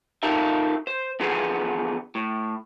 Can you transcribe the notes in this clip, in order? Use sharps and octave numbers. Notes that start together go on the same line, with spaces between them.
D#4 F4 A4 A#4 E5
C5
E2 D3 F3 B3 G#4 B4
A2